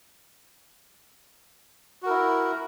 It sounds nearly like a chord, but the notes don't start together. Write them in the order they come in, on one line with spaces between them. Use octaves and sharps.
F#4 A#4 E4